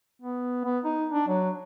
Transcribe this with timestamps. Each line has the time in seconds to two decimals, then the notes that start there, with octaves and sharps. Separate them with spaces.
0.22 B3
0.65 B3
0.85 D#4
1.12 D4
1.28 F#3